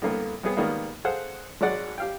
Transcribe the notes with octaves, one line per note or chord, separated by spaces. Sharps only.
C2 A2 D3 A#3 B3
C2 B3 G#4
G#2 D#3 G3 A#3 B3 F4
G#4 A4 C5 F5 F#5
G#1 F#3 G#3 D5 F#5
G4 F5 G5